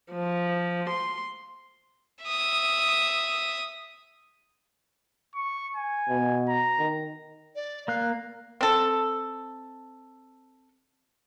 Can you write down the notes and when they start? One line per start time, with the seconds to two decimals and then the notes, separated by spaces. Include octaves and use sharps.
0.12 F3
0.90 C6
2.24 E5 D#6
5.35 C#6
5.76 G#5
6.09 B2
6.49 A#5
6.79 D#3
7.55 D5
7.88 A#3 F5 F#6
8.61 C4 A4